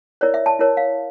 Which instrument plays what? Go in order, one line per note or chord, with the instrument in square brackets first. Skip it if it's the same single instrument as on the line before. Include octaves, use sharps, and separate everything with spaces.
[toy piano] E4 A#4 C#5 D5
E5
A5
E4 A#4 C#5
F5